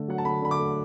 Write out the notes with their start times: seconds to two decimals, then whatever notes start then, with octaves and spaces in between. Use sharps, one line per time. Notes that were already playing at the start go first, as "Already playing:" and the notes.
Already playing: D3 A3
0.08 F#3 F#5
0.18 A5
0.25 D3 B5
0.42 D3 B5
0.51 D6
0.59 A3